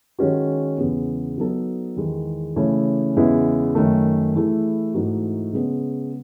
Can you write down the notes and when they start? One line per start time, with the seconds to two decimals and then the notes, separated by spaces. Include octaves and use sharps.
0.19 D#3 G#3 C#4 F#4
0.78 E2 C#3 G#3 B3
1.38 F#3 B3 D#4 A4
1.96 E2 D#3 G#3
2.56 C#3 E3 A3 C#4 G#4
3.16 E2 C#3 G#3 B3 E4
3.75 F#2 D#3 A3
4.34 E3 A3 E4 G#4
4.94 G#2 E3 A3 D#4 F#4
5.53 C#3 G#3 B3